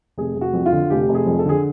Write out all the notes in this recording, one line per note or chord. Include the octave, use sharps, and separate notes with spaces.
F1 G#4
F1
F#4
F2
F4
D3
F1 G4
F1
G#4
F2
A4
D3 G#4